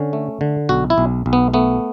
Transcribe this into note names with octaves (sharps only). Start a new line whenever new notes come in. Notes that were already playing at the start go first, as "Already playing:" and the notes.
Already playing: D3 C#4
A3
D3
B1 F#4
E4
B1
B1
B3
A3 B3